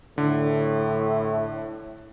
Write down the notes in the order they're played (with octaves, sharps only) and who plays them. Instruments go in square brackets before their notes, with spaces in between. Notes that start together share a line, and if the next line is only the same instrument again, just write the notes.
[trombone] A2 [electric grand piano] D3